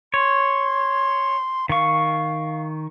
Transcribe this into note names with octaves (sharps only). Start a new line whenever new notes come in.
C#5 C6
D#3 F5 C#6